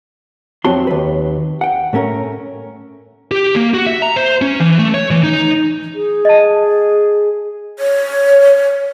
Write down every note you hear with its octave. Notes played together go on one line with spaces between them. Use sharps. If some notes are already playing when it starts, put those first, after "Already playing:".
F2 F#3 C4 F#4 A5 C6
D#2 B4
F#5 G5
A2 A3 C#4 A#4
G4
A#3
F#4
E5
A#5
C5
C#4
E3
A3
C#5
E3
D#4
G#4
D#5 A5
C#5